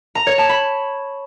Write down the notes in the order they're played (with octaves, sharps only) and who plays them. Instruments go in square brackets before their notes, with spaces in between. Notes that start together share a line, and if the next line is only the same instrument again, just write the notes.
[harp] A#5
C#5
A5
B5